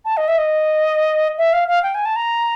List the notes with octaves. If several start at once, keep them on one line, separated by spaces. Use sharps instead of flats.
A5
D#5
E5
D#5
E5
F5
F5
G5
G#5
A5
A#5